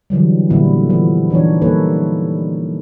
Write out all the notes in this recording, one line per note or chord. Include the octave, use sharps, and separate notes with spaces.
D3 E3 F#3 G3
A#2 D3 G3 B3 E4 F#4
E3 F3 B3
E3 D4 D#4 C#5
G3 A#3 D#4 A4 B4 C#5